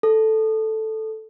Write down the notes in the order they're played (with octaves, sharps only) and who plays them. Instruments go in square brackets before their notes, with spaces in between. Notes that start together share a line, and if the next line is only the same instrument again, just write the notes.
[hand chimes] A4